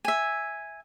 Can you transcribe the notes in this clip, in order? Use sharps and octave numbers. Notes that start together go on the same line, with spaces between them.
E5 G#5